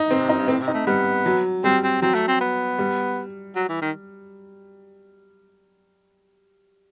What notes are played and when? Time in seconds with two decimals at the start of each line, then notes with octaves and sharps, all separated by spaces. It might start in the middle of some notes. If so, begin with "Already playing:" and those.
Already playing: D#4
0.10 D#3 C4
0.20 C3
0.29 F#2 D#4
0.39 G2
0.48 A2 C4
0.61 C3
0.68 D#4
0.74 A3
0.87 G3 B3
1.26 F#3
1.64 G3 C4
1.83 C4
2.02 F#3 C4
2.14 A3
2.28 C4
2.40 B3
2.79 G3
3.55 F#3
3.69 E3
3.82 D#3